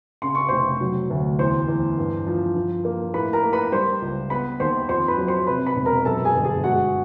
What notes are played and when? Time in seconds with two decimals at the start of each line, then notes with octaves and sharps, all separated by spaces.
0.22 C#3 C6
0.35 C#6
0.48 F1 C5 C6
0.81 F#3
1.10 D2
1.39 E2 C5 C6
1.68 E2
1.98 G2
2.27 F3
2.56 F3
2.85 A#3
3.14 A2 B4 B5
3.33 A#4 A#5
3.43 A#3
3.53 B4 B5
3.72 G3 C5 C6
4.02 C#2
4.30 B3 B4 B5
4.60 D#2 C5 C6
4.88 F2 C5 C6
5.08 B4 B5
5.18 F#3
5.27 C5 C6
5.47 C3 B4 B5
5.67 B4 B5
5.76 E1
5.86 A#4 A#5
6.05 F#2 A4 A5
6.25 G#4 G#5
6.34 G1
6.44 G#4 G#5
6.64 G#3 F#4 F#5